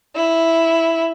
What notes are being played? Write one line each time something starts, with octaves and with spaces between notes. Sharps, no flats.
E4